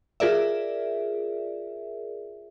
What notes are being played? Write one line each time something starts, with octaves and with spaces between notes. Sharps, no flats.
F4 G#4 A#4 D5 E5